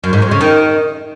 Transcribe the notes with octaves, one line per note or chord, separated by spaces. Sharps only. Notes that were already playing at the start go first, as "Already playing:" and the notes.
F#2
G#2
F2
C#3
D#3